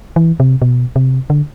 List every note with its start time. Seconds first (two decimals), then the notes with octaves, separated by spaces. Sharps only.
0.16 E3
0.40 C3
0.62 B2
0.96 C3
1.30 D3